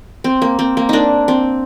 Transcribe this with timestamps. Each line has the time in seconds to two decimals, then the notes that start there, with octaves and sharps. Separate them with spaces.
0.24 C4
0.42 A#3
0.59 C4
0.77 A#3
0.89 A#3 D4 D#4
1.28 C4